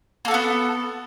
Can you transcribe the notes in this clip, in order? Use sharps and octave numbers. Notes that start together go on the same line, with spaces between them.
A#3 B3 F#4 A4